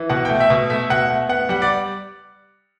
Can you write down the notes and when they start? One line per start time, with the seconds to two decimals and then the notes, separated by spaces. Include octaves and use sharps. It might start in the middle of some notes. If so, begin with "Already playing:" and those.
Already playing: E3
0.09 B2 F#5
0.25 A3 G5
0.40 E5
0.50 B2
0.70 A3 E5
0.90 B2 F#5
1.10 A3
1.29 B3 F#5
1.49 G3 F#5
1.62 D5